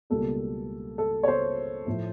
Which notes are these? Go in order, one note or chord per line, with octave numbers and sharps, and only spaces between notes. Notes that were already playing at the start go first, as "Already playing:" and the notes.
C#2 B2 G3 A#3 A4
A4
C#5
C5
A2 F3 A3